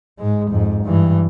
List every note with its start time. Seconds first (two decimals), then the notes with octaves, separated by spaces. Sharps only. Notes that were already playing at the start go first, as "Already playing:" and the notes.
0.19 G#2 G#3
0.50 F2 G#2
0.84 G2 E3